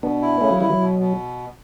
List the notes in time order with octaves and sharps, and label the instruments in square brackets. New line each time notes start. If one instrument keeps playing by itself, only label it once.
[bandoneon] B2 [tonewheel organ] B3 D4
[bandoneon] E4
[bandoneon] C#3 [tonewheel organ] A3 C#4
[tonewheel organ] F#3
[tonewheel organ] E3 G3 [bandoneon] E4
[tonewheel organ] F#3
[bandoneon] B2
B2